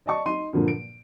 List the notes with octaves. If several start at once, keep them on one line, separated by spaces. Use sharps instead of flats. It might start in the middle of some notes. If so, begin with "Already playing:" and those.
D5 D#5 A5 C#6
D#4 C6 D#7
G2 A#2 D3 F3 A#3
D7